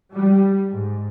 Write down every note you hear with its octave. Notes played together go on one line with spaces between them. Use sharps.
G3
G#2